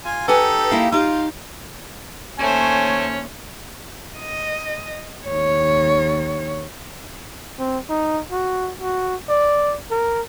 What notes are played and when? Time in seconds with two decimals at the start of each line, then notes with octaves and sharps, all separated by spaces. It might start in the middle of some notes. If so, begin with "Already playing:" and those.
0.05 F4 G#5
0.28 D#4 G4 A4 B4 F#5 G#5
0.71 A#3 E4 F5
0.92 D#4 F4 G4 F5
2.39 D#2 A3 C#4 C5 C#5 G#5
4.18 D#5
5.27 D#2 C#5
7.59 C4
7.89 D#4
8.31 F#4
8.81 F#4
9.29 D5
9.91 A#4